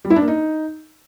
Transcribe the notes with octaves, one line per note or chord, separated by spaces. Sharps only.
G3
E4
D4
A#3
D#4